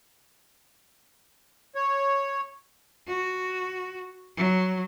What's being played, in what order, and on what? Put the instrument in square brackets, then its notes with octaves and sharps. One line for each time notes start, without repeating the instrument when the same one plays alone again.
[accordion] C#5
[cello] F#4
F#3